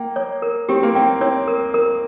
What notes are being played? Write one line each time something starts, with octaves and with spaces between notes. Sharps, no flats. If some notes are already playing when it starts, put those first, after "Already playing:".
Already playing: A#3 G5
C#5
A#4
C4 G4
A#3
C4 G5
C4 C#5
A#4
A#4